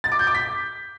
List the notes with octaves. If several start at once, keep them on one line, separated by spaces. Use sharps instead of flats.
A6
D6
G6
D6
B6